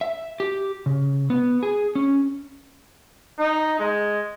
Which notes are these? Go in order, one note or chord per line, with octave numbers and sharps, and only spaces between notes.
E5
G4
C#3
B3
G#4
C#4
D#4
G#3